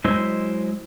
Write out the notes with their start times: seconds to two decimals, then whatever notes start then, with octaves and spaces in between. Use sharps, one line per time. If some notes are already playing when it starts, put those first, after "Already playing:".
0.04 F#3 G#3 E4 C5 D#5